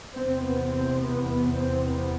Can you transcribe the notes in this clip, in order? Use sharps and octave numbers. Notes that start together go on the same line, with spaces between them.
E2 C3 C4
B3
C4
B3
B3
C4
B3